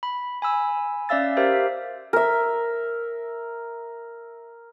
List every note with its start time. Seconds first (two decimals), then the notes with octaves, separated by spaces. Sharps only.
0.03 B5
0.42 G#5 B5 E6
1.09 C#4 D5 E5 F5 E6 A6
1.37 G4 A#4 C5 E5 F5
2.13 A#4 E5